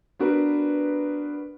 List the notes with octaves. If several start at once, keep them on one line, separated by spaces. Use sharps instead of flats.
B3 D4 F#4 A#4 B4